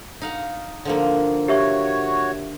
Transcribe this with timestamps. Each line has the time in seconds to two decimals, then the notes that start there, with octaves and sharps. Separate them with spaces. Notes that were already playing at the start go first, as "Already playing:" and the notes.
0.21 D#4 F5 F#5
0.85 D3 F3 A#3
1.48 F#4 G4 C#5 E5 C#6